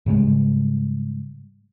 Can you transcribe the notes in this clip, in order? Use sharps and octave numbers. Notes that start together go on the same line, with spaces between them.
G#2 C#3 G3 G#3